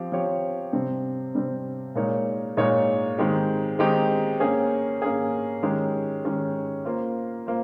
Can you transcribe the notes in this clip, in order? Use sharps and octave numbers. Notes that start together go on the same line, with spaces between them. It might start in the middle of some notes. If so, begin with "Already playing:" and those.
Already playing: F3 C4 G4
F3 C4 G4 C#5
C3 G3 C4
C3 G3 C4
A#2 G#3 D#4 A#4 C#5
A#2 G#3 D#4 A#4 C#5
D#3 G#3 C4 D#4 G4
D#3 G#3 C4 D#4 G4
A#3 C#4 G#4
A#3 C#4 G#4
D#3 G#3 C#4 G4
D#3 G#3 C#4 G4
A#3 F4 C5
A#3 F4 C5